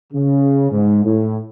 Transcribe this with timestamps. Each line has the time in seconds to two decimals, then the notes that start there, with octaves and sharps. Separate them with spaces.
0.13 C#3
0.71 G#2
1.04 A2